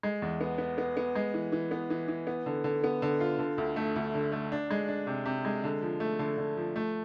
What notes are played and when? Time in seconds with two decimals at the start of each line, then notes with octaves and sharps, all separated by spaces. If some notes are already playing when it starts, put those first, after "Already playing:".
0.03 G#3
0.22 E2
0.41 B3
0.58 B3
0.78 B3
0.97 B3
1.15 G#3
1.34 E3
1.52 E3
1.71 B3
1.90 E3
2.08 E3
2.27 B3
2.46 D3
2.64 D3
2.84 B3
3.02 D3
3.20 F4
3.39 D3
3.58 D2
3.76 A3
3.96 D2
4.14 D3
4.32 A3
4.52 D4
4.71 G#3
4.88 D4
5.07 C3
5.25 C3
5.45 G#3
5.64 D3
5.82 F3
6.00 A3
6.19 D3
6.37 D3
6.57 F3
6.76 A3